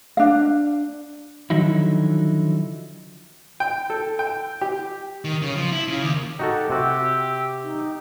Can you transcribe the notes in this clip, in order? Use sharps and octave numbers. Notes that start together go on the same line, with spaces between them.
D4 F5
D3 D#3 F3 F#3 D#4 E4
G5
A4
G5
G4
D#3
C#3
F3
E4
C#3
D#2
D#4 F#4 G4 A4
C3 F#4 E6
D#4